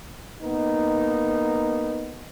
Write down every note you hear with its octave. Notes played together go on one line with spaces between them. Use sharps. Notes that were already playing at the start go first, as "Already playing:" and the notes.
A#3 B3 D#4